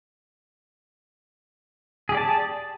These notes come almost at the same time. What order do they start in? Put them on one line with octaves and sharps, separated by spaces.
G#4 G4 D5 A5